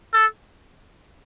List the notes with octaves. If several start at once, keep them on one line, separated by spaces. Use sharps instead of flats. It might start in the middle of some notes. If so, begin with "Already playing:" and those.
A4